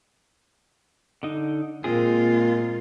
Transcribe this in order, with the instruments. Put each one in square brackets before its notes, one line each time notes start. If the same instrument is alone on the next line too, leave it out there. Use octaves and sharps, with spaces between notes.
[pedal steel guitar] D3 D#4
[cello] A#2 F4 [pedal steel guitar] G#3 C4 G#4 [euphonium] A#3